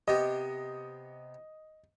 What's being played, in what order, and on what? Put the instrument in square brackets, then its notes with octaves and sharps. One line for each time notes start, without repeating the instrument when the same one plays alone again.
[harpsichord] C3 B3 G4 [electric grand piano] D#5